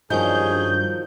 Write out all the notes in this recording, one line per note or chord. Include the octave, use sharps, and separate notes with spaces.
G2 D#3 F3 F#3 C#4 D4 G#4 G6